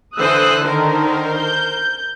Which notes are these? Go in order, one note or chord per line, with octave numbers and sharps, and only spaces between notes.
D3 E3 C5 D#6 E6 F#6
D3 D#3 D#4 A#4 C5
G6